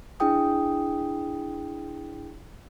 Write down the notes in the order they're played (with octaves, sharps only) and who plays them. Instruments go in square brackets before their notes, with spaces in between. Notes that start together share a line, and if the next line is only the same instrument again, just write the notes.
[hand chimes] D4 E4 G#4 G5 D#6